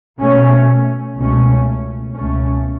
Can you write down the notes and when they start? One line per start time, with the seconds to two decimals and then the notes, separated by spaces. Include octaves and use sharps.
0.19 B2 A3 C#4
1.17 C#2 B2 A3 C#4
2.14 C#2 B2 A3 C#4